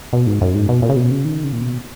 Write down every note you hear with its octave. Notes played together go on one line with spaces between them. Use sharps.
B2
G#2
F#2
G#2
B2
A#2
C#3
B2
C#3
D#3
C#3
A#2
B2